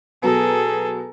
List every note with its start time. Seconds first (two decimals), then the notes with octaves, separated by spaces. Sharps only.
0.23 B2 F#3 B3 G#4 A4